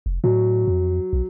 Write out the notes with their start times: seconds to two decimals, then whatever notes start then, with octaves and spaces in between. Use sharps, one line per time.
0.06 F1
0.24 A2 F#3
0.68 F2
1.13 B1